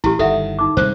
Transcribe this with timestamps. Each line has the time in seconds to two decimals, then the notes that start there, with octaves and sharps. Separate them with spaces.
0.04 A1 E4 G4
0.19 G1 D#3 A4 E5 F#5
0.59 D#4 D6
0.77 C3 G3 G#3 C5